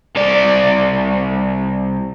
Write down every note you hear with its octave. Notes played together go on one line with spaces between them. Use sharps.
C2 D5